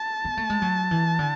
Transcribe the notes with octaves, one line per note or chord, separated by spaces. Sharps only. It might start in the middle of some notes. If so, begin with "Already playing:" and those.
Already playing: A5
B3
A3
G#3
F#3
E3
D3